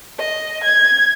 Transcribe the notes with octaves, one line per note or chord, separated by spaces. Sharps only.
D#5
G#6